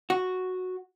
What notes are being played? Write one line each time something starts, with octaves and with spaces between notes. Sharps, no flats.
F#4